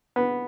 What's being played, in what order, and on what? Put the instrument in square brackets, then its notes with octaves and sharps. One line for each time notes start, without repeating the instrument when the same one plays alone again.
[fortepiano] B3